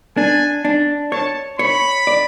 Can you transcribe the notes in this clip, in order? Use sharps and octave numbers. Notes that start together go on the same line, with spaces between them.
D4 G#5
D4
C#5 A5
C#5 B5
D5